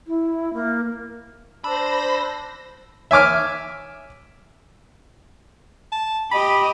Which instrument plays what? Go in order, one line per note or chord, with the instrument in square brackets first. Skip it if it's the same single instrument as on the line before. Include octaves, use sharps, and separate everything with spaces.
[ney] E4
A#3
[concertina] D4 E6 [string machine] C5 A#6 [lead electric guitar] B5
[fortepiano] E5 G#5 D6 F6
[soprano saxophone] A5
[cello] G4 D#5 [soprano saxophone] B5